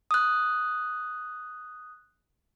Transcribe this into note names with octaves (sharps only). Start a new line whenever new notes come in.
D#6 F#6